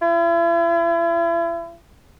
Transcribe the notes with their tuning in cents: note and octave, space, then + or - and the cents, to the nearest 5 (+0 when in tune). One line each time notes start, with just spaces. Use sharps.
E4 +40